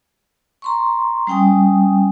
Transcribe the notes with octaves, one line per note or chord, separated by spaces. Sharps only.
A#5 C6 C#6
G3 C#4 G5 G#5 D#6